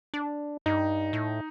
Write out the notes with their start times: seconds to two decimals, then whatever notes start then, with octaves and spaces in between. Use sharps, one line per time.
0.14 D4
0.66 G2 D#4
1.13 A2